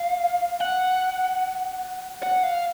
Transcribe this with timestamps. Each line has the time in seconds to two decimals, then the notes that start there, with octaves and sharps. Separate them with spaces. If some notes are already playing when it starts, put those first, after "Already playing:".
Already playing: F5
0.60 F#5
2.23 F#5
2.43 F5